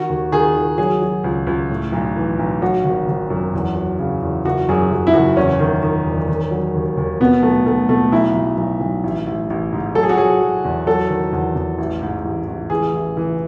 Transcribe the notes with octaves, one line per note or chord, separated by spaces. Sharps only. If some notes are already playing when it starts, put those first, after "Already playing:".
Already playing: D#3 F#4
D#2
D#3 G#4
D#3
F#3 G#4
F#3
C#2
C#2
A2
B1
E3
B1
F#3 F#4
G#1
G#1
F#2
E2
F#3
C#3
E2
F#1 F#4
F#2 G#4
F#2
E4
F#1 F#4
E2 C#4
D#3
D#3
E1
D#3
F#3
D#2
D#2
B2 B3
B1 A3
B1 A3
B2 A3
B1 E4
B1
B1
B1
A1
A1
A1
G#2
F#3 A4
G#4
F#4
F#3 G#4
F#3
E2
F#3 A4
D#3
E2
E2
A1
G#2
A1
A1
E3 G#4
A1
E3